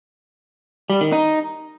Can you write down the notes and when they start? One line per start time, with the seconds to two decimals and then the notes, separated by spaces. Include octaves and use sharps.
0.90 G3
1.01 D#3
1.12 D#4